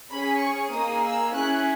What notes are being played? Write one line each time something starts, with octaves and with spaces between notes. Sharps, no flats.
C#4 G#4 B5
C#6
A#3 D#4 G#4 D#6
E6
C#4 E4 G#4 F#6